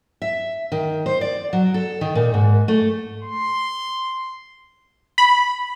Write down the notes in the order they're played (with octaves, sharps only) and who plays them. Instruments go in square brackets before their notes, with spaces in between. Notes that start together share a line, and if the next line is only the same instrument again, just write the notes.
[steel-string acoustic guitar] E5
D#3
C5
D5
F#3
A4
D#3
A#2
G#2
A3
[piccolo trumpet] C6
[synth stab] B5